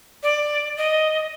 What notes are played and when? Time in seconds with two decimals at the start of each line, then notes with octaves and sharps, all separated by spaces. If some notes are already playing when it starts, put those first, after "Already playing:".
0.23 D5
0.77 D#5